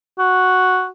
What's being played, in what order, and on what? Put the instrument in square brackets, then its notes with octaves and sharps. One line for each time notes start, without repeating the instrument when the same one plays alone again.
[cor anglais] F#4